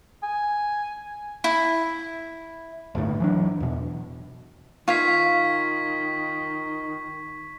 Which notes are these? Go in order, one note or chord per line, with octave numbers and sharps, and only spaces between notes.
G#5
E4
G1 D#2 A2
E3 F#3 D4
E2 B2
D#3 F4 F5 C#6 G#6 B6